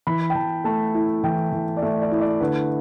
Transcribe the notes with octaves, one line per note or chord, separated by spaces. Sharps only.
E3 B5
G5
E3 A5
A3 A5
E4
E3 G5
E3
D5
A3 E5
D5
E4
D5
D3 B4